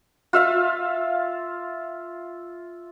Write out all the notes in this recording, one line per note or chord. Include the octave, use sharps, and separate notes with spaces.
F4 E5 F5